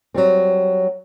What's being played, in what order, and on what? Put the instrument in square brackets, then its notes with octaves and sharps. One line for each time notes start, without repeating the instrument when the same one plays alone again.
[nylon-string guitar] F#3 G3 C4